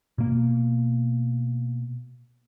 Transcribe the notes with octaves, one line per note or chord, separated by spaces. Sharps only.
B2 A#3